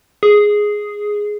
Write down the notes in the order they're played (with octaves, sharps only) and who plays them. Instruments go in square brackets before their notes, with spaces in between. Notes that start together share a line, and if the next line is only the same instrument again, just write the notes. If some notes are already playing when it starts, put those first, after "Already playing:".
[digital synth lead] G#4